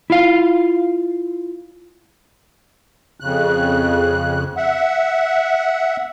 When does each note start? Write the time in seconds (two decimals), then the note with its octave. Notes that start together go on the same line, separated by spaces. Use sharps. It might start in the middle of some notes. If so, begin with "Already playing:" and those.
0.10 E4 F4 F5
3.20 F2 C#3 F#6
4.57 E5 F#5